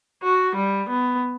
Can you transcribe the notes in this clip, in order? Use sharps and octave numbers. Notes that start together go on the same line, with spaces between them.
F#4
G3
B3